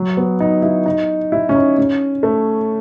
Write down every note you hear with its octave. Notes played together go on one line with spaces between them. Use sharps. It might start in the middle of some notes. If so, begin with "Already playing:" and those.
Already playing: F#3
B3
D#4
E4
D#4
E4
C#4
D#4
C#4
A3